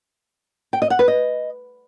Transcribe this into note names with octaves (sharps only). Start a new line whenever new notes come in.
G5
D#5
F#5
B4
D#5